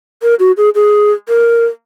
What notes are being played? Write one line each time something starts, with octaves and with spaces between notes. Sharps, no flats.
A#4
F#4
G#4
G#4
A#4